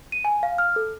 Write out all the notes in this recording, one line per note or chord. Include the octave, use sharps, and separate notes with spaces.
D#7
G#5
F5
F6
A4